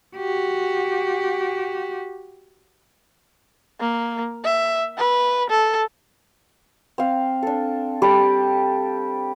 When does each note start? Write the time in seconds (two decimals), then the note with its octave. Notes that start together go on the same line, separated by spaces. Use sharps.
0.16 F#4 G4
3.80 A#3
4.44 E5
4.98 B4
5.50 A4
6.98 C4 F5
7.43 D4 A4
8.02 G3 G4 A4 D6